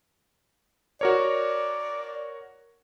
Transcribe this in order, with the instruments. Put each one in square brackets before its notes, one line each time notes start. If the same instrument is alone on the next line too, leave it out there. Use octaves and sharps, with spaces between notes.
[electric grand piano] F#4 A#4 C#5 [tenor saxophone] D5